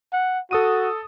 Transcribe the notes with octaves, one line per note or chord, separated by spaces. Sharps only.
F#5
F#4 A4 D#6 D#7